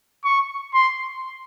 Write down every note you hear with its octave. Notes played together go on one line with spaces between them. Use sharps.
C#6
C6